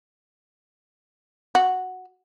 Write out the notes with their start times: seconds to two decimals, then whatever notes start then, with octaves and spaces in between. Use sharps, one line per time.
1.55 F#4